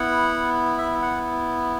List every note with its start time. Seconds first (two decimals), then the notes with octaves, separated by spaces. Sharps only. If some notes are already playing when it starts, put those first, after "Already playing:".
Already playing: B3 E4 F#5
0.78 E5
1.02 F#5